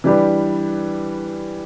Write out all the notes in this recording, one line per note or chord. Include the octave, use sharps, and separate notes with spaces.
E3 G3 D4 G4 B4